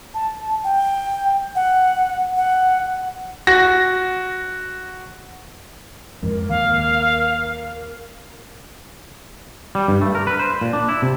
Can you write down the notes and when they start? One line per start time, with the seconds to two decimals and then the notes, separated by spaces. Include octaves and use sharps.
0.14 A5
0.64 G5
1.55 F#5
2.37 F#5
3.47 F#4 A#6
6.23 F2 G#2 A#4
6.49 D#2 F5
9.75 G3
9.88 G2
10.01 A3
10.15 A#4
10.27 B4
10.39 C5
10.61 A#2
10.73 D4
10.89 E4
11.02 C3